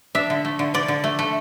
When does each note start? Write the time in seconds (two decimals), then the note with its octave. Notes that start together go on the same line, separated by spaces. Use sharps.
0.15 D4 E5
0.30 D3
0.45 A3
0.59 D3
0.74 D3 D5
0.88 D3
1.04 A3
1.19 A3